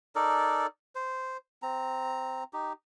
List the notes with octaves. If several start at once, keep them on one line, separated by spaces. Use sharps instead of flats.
D#4 A4 A#4 D5
C5
C4 A#5
D#4 G4